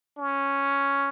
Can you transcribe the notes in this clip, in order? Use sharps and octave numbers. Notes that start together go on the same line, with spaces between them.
C#4